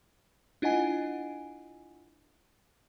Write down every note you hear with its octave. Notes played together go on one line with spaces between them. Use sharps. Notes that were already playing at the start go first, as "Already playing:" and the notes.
D4 E4 F4 D#5 F#5 G#5